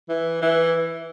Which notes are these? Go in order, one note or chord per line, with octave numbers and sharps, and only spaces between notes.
E3
E3